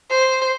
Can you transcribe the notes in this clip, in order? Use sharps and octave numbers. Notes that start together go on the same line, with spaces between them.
C5